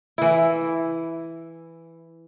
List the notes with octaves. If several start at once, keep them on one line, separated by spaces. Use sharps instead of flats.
E3 E4